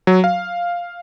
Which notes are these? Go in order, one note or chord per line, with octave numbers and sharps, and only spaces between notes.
F#3
F5